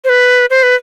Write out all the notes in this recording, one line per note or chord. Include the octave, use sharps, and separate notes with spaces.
C5
B4
C5
B4